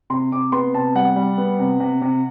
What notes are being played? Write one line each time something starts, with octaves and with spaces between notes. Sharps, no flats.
C3 C6
C3 D6
B3 C6
C3 A5
G3 F#5
G3
B3
C3
C3
C3